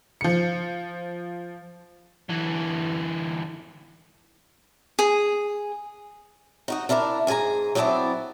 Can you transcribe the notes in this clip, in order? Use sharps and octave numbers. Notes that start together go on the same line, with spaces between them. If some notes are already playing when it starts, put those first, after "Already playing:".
F3 C#7
D3 E3
G#4
D#4 F#4 D#5
D4 E4 A#4 C#5 D5
G#2 G#4 A#4 G#5 A#5
F#3 B3 C4 D4 E4 D5